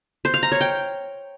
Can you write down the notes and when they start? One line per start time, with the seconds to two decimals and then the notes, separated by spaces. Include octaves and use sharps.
0.25 C5
0.34 F5
0.43 A#5
0.52 C#5
0.61 G5